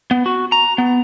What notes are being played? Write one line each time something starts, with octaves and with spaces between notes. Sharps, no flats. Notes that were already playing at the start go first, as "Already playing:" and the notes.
B3
F#4
A#5
B3